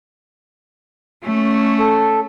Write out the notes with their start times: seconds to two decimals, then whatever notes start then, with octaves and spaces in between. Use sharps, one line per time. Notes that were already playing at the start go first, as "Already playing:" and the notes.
1.24 A3 C#4
1.80 A4